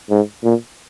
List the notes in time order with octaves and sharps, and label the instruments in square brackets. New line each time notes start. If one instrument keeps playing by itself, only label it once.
[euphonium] G#2
A#2